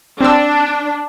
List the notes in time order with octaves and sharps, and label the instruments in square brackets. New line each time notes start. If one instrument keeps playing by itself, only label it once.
[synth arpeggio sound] C4 E6 [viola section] D4